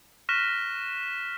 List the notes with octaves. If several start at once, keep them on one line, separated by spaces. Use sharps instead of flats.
C#6 F6 F#6 A#6 B6 E7